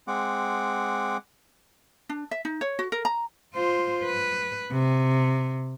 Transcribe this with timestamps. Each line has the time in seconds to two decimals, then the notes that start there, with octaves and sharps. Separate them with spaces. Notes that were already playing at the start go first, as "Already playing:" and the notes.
0.08 G#3 C4 F#5 D6
2.09 D4
2.31 E5
2.45 D#4
2.61 C#5
2.79 F#4
2.92 A#4
3.05 A#5
3.54 F4 C5
4.05 B4
4.72 C3